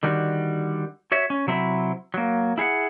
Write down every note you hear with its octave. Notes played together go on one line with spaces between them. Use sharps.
D3 D#3 G3 F#4
F#4 C#5 E5
C#4
C3 F#3 C4 E4
F#3 A#3
E4 G#4 F5 F#5